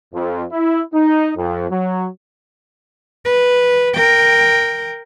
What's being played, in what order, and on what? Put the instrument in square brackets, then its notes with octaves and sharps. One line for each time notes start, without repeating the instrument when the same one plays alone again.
[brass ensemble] F2
E4
D#4
F2
F#3
[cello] B4
A#4 G5